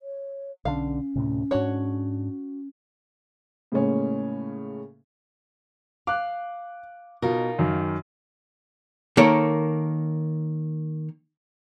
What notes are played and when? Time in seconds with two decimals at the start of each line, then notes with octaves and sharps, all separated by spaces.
0.01 C#5
0.65 B1 D3 C#4 D4 F5
1.15 D2 A2 C3
1.51 G#2 D4 F#4 C#5
3.72 A2 C#3 G#3 A#3 C#4 G#4
6.07 F5 D6 F#6
7.22 B2 D#4 F4 A#4
7.59 F#2 D#3
9.17 D#3 A#3 A4 C#5